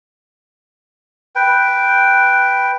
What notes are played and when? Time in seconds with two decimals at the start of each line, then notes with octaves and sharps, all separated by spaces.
1.35 B4 G5